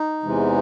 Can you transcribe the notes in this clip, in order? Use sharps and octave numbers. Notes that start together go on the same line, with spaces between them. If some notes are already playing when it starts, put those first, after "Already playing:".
Already playing: D#4
E2 C3 E3 G#3